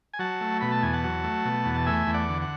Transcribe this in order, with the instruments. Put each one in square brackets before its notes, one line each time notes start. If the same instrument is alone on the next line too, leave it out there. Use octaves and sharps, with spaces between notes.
[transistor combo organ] G#5
F#3 F#5 A5
A3
B2 B5
A5
E2 G#5
F#5 A5
F#3
A3
B2
E2
A5
A3 E5 G#5
E2
D5 F#5
D3
F#5